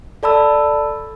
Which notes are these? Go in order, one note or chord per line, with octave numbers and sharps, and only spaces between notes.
A4 D5 A5 B5 E6